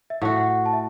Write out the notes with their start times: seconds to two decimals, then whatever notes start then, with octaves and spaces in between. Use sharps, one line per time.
0.10 E5
0.22 A2 A3 F#4 F#5
0.36 F#5
0.50 F#5
0.66 A5
0.73 E5